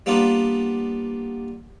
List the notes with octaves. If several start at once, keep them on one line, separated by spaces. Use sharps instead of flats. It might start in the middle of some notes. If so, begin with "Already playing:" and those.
G3 A#3 B3 D4 F4